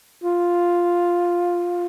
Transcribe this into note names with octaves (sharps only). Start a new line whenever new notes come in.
F4